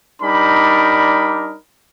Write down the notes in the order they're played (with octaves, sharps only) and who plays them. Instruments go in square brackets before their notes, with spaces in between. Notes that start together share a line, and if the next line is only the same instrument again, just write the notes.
[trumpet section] G3 D4 D#4 A#4 B5